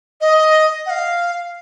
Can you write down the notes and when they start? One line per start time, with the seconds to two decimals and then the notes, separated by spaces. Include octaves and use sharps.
0.21 D#5
0.86 F#5
0.90 F5